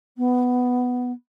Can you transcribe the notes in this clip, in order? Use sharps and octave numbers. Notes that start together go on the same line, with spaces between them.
B3